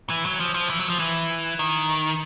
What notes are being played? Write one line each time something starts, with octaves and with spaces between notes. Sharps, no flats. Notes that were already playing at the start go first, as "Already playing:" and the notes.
E3
F#3
F3
F3
E3
F#3
F3
E3
D#3